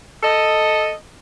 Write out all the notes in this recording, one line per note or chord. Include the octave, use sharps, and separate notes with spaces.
A4 D#5